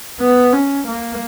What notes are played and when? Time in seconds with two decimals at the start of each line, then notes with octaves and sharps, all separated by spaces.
0.20 B3
0.53 C#4
0.87 A#3